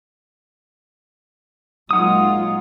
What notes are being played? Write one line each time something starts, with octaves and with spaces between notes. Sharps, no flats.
A#2 F#3 G#3 D#4 F4 F#5 D#6